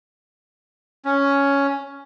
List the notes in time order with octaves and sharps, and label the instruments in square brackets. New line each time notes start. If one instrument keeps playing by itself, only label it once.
[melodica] C#4